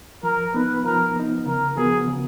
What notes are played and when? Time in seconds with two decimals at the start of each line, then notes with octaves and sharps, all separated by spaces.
0.23 F3 A#4
0.53 B3 D#4 B4
0.84 F3 A#4
1.16 B3 D#4
1.46 C#3 A#4
1.77 F3 B3 F#4 G#4 A#4
2.08 C#3